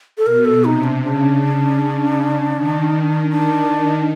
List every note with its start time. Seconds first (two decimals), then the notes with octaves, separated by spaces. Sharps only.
0.18 A4
0.26 B2 A#4
0.45 A4
0.64 C3 D#4
0.84 D4
1.02 C#3 D4
2.54 D#3
3.30 D#3 D4